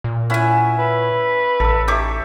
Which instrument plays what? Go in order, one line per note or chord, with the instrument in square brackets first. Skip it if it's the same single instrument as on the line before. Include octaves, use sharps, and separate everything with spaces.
[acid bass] A#2
[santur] C#4 E4 E5 [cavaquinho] F#5 G#5
[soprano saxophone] B4
[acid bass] A1 [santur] A4 E6
[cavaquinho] D#4 C#5 D6 [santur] G4 E5